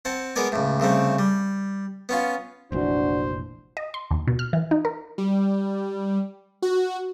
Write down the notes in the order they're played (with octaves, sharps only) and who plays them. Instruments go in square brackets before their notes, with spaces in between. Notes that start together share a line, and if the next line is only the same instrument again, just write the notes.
[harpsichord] C4 F#5 A5
G#3 B3 A#4 D5 G#5
C#2 A2
C2 C#3 A3 C4
G3
B3 C#4 F4
[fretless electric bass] F1 A#1 E3 [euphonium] D4 [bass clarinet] F#4 [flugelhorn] C5
[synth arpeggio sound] D#5
C6
D#2
B2
F6
E3
D#4
A#4
[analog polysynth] G3
F#4